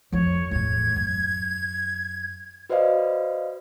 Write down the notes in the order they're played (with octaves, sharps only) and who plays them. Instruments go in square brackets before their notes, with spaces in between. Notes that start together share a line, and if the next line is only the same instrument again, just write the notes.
[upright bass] F2 F3 [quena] C#5
[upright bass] E2 A2 [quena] G#6
[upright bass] F#2
[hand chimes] F#4 B4 C5 D5 D#5 F5